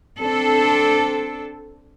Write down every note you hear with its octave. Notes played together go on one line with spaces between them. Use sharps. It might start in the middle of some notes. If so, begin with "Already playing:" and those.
C4 D4 A4